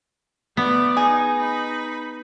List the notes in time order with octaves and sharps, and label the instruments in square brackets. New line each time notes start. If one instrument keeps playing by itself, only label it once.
[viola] A3 D5 [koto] B3
[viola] D#4 [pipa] G#4
[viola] D#4 B5